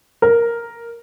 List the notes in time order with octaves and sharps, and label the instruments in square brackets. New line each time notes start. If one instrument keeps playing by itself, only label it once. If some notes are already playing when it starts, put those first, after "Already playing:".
[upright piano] A#4